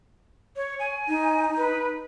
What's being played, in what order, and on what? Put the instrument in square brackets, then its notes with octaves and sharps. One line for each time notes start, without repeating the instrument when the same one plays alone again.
[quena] C#5
G#5
[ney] D#4
[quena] B4